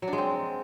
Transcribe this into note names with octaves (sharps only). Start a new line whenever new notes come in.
F#3
D4
G#3
C4